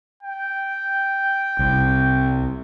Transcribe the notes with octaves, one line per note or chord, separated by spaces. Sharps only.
G5
C2